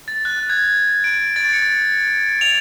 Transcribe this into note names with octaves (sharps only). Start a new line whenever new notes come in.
A6
F#6
G#6
D7
A6
C#7
F7